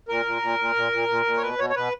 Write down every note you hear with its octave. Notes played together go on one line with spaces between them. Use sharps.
A#2 A#4
A#2
A#2
A#2
A#2
A#2
A#2
A#2
C#5
B2 B4
B2 C#5
C#5
B2 B4